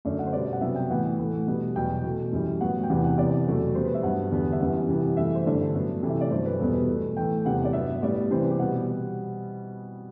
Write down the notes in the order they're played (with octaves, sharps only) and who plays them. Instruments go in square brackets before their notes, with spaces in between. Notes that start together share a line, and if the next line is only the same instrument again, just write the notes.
[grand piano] F#2 D3 A3 D5
F#5
C5
B2 G3 B3 D5
F#5
C3 F#3 B3 E5
G5
A2 E3 B3 F#5
A2 E3 A3
B2 G3 B3
E2 B2 F#3 B3 G5
B2 A3
F#2 E3 G3
A2 F#3 B3 F#5
G5
E2 C3 E3 B3 F#5
F#5
C3 E3 B3 D5
E2 B2 F#3 A3
B2 G3 B3 C5
B4
E5
G2 F#3 B3 F#5
E2 D3 G3 B3
E5
F#2 E3 G3 B3 F#5
C3 E3 G3 B3
F#2 E3 A3 E5
C5
G2 D3 A3 D5
A2 F#3 B3
C3 E3 A3
E5
D5
G2 F#3 A3 C5
B4
E2 B2 G3 B3 A4
B4
B2 A3
A2 E3 A3 G5
E2 C3 G3 B3 F#5
D5
G2 F#3 B3 E5
A2 G3 B3 D5
C3 E3 B3 C5
B4
G4
B2 G3 B3 F#5